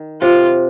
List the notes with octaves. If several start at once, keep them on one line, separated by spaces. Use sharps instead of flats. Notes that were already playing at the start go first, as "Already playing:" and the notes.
Already playing: D#3
C3 F4